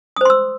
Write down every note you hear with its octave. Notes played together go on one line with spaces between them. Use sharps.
C5 C6 D#6 E6